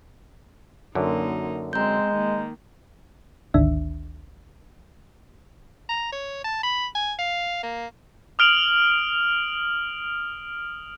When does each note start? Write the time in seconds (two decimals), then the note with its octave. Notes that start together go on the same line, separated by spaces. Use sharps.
0.95 F#2 D3 A#3 D#4
1.73 G#3 C4 A#5 G6
2.11 D#3 A#3
3.54 G#1 D2 D#3 D4 E5
5.89 A#5
6.13 C#5
6.45 A5
6.63 B5
6.95 G#5
7.19 F5
7.63 A#3
8.39 D#6 F6 D7 F7 F#7